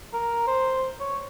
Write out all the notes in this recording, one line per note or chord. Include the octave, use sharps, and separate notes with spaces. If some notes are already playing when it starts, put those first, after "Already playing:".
A#4
C5
C#5